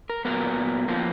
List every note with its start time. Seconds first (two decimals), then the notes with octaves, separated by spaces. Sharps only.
0.10 A#4
0.25 A#2 F#3 B3 A#4
0.88 F2 F3 A#3